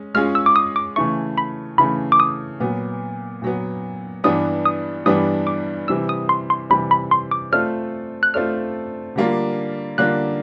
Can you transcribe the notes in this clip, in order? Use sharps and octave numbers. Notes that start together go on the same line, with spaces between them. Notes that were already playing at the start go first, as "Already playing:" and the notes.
Already playing: G#3 C#4
G#3 C#4 F4 G#4 C#5 F6
E6
D6
D#6
D6
C#3 E3 A3 C#6
B5
C#3 E3 A3 B5
D6
D#6
A#2 F#3 B3
A#2 F#3 B3
G2 E3 G3 B3 D4 D#6
D#6
G2 E3 G3 B3 D4 D#6
D6
C3 E3 G3 E6
D#6
C6
C6
C3 E3 G3 B5
B5
C6
D6
A3 C4 F4 A4 D5 F6
F#6
A3 C4 F4 A4 D5 F6
D3 G3 A#3 D4 F4
D3 G3 A#3 D4 F4 F#6